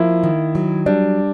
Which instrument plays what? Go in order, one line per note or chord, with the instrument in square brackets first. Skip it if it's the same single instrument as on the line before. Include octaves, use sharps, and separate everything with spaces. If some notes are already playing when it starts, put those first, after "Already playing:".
Already playing: [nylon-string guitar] F3 A#3 [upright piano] E4
[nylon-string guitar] D#3
F#3
[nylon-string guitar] G3 [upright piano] D4